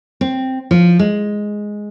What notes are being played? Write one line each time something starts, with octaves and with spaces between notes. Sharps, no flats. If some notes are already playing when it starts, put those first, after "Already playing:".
C4
F3
G#3